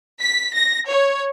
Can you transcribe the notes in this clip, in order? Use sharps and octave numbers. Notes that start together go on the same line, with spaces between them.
B6
A#6
C#5